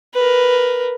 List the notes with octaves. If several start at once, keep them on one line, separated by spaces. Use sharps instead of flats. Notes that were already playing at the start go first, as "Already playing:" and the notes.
A#4 B4